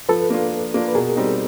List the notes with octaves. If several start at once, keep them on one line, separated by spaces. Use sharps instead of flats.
F3 A4 B4
A#3 D4 F4
F3
A#3 D4 F4
B4
B2 G#4 A#4
G3 C4 D#4